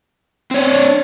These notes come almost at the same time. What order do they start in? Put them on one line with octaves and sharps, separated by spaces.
C4 C#5 D4